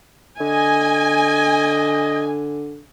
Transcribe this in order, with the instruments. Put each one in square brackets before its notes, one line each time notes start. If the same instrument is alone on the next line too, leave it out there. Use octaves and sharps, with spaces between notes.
[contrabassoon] D3 [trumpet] D#5 [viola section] G#5